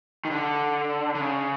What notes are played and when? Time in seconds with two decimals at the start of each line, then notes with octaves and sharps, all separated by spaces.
0.25 D#3
0.30 D3
1.15 D3
1.21 C#3